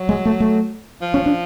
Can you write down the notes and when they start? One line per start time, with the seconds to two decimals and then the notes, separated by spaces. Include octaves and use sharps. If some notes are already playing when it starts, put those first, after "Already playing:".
Already playing: F#3
0.09 G#3
0.26 A3
0.40 A3
1.02 F3
1.14 C#4
1.26 D4